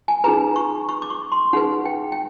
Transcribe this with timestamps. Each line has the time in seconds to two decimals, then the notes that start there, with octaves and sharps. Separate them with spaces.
0.08 G#5
0.24 D#4 G#4 B4 A#5
0.56 C#6
0.89 C#6
1.02 D6
1.10 C#6
1.32 C6
1.53 D#4 G#4 B4 F#5
1.85 G5
2.12 G5